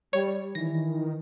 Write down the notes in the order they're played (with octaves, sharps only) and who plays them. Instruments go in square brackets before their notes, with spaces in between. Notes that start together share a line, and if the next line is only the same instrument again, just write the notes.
[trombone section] G3 [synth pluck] C#5
[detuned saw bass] D#3 [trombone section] E3 [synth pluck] A#6